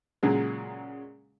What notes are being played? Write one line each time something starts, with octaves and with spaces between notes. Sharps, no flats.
A#2 C#3 F#3 G#3